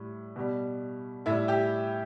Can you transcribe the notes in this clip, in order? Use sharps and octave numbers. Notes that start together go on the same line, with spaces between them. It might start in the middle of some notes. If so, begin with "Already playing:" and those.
Already playing: A2 G3
B2 G3
A2 G3 E4 E5
G4 G5